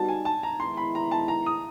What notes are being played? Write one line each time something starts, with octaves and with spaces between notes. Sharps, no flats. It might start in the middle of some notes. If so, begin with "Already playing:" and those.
Already playing: G3 B3 D#4 F#4 A5
G#5
A5
A#5
D#3 G#3 B3 E4 C6
B5
A#5
A5
A#5
D#6